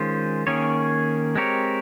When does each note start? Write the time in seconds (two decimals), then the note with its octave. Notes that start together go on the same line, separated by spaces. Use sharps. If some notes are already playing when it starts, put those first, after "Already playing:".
Already playing: D#3 G#3 C#4 F4 C5
0.47 D#3 A#3 C#4 G#4 C#5
1.35 G#3 C4 G4 A#4 C#5